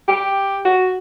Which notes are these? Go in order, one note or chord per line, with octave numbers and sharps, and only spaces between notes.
G4
F#4